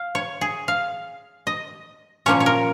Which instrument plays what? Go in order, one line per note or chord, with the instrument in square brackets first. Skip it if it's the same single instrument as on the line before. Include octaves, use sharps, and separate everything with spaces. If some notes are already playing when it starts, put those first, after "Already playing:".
Already playing: [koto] F5
C#5
G#4
F5
D#5
A#2 F3 A#3 C#4 C#5
C#5
A#4